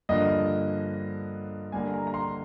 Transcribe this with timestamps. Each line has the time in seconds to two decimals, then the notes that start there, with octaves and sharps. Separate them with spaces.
0.09 G2 D3 F3 A#3 D#5
1.72 D3 G3 A#3 G#5
1.94 A#5
2.07 A#5
2.14 C6